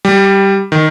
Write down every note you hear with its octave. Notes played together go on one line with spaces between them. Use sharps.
G3
D#3